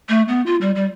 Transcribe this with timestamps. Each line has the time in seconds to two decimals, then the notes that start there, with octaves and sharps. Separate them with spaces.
0.09 A3
0.28 B3
0.46 F4
0.61 G3
0.75 G3